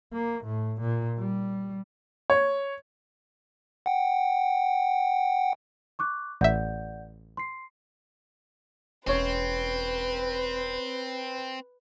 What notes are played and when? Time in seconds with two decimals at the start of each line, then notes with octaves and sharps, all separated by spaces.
0.13 A#3
0.45 A2
0.81 A#2
1.19 G3
2.30 C#5
3.86 F#5 G5
5.99 C#6 D6 F#6
6.41 A1 D5 E5 F#5 G6
7.37 C6 C7
9.07 E1 C4 C#4 B4 C#5